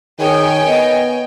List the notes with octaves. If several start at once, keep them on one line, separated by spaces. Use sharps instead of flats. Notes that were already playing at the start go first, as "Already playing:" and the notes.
D#3 G#4 C#5 G5 G#5
B3 D#5